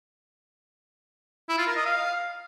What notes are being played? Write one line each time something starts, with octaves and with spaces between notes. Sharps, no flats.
E4
F4
A#4
D#5
F5